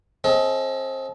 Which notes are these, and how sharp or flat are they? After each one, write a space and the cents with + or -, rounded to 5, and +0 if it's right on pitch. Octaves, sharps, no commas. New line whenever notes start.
C4 +30 A4 -40 D#5 +25